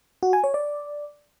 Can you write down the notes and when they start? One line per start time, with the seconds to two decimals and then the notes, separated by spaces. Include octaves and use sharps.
0.23 F#4
0.33 G#5
0.44 C#5
0.54 D5